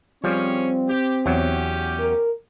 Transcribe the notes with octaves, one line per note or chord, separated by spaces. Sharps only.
F3 G3 C4 C#4 G#4 C#5
G4
E2 F#3 C#4 G4
A#4